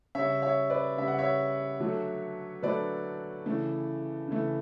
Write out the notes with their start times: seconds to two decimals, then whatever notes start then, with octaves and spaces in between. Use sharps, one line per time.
0.15 C#3 G3 C#5 E5
0.42 C#5 E5
0.70 B4 D5
0.97 C#3 G3 E5
1.07 F#5
1.18 C#5 E5
1.80 D3 F#3 A3
2.62 D3 F#3 A3 B4 D5
3.46 C#3 E3 A3
4.28 C#3 E3 A3